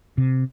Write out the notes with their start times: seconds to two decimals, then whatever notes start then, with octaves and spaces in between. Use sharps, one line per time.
0.18 C3